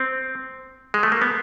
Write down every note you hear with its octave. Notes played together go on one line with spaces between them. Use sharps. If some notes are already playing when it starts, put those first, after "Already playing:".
Already playing: C4
G#3
A3
A#3
B3